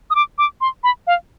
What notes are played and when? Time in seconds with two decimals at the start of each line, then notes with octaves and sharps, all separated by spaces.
0.10 D#6
0.15 D6
0.38 D6
0.61 C6
0.84 B5
1.07 F5